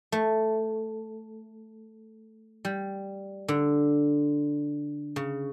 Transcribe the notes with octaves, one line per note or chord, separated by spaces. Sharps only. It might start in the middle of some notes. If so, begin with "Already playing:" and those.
A3
G3
D3
C#3